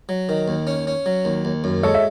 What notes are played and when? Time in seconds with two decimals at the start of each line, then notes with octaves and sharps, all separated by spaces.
0.09 F#3
0.29 D#3
0.48 D#2
0.67 C#4
0.87 C#4
1.06 F#3
1.25 D#2
1.45 D#2
1.64 F#2
1.83 G#3 A4 C#5
1.94 E5